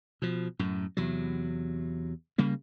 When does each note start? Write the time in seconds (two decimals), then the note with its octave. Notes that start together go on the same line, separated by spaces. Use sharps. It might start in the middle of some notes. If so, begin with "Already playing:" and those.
0.22 B2 F3
0.59 F#2 A2
0.97 E2 C3 F#3
2.38 C#3 G3 A#3